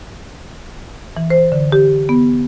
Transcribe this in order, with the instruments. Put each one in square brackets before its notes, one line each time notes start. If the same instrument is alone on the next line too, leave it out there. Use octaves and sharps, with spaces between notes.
[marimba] E3
C5
D3
G4
B3